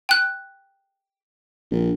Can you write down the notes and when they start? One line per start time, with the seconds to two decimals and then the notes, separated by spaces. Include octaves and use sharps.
0.09 G5 F#6
1.71 A#1